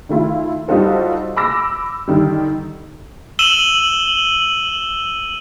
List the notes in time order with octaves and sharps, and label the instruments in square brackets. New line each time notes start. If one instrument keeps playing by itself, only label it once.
[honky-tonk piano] D#3 A3 E4 F4
G3 D#4 F4 F#4 A4 C5
B5 D6 E6 A#6
D3 D#3 G3
[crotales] E6 D#7 E7 F#7 G7